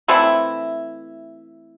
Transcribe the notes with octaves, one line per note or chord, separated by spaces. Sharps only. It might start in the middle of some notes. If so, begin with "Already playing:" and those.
E3 A3 C4 E4